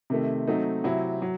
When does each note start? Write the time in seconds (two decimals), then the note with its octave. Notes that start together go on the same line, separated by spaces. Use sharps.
0.10 C3 D#3 A3
0.47 F#3 A3 C4 D#4
0.84 C3 F#3 C4 E4
1.22 F#3